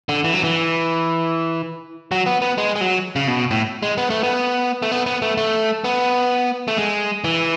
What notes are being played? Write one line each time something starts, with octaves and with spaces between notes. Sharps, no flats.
D3
E3
F#3
E3
F#3
B3
B3
G#3
G#3
F#3
C#3
B2
A2
G#3
B3
A3
B3
A3
B3
B3
A3
A3
B3
A3
G#3
E3